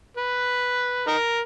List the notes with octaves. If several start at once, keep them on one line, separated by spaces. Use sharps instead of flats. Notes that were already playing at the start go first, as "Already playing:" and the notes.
B4
D#4 A#4